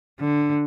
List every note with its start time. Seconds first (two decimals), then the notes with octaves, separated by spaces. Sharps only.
0.20 D3